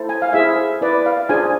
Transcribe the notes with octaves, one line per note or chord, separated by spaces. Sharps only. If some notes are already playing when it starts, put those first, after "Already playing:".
Already playing: E4 A4 C5
G#5
F5
E4 G#4 C5 E5
E4 B4 D5
F5
D4 F4 G#4 C5 G#5